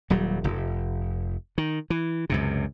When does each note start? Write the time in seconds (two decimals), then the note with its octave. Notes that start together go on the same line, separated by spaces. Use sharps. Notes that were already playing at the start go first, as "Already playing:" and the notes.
0.10 D#1 F#3 G3
0.44 F1
1.58 D#3
1.90 E3
2.30 C#2 F#2 C3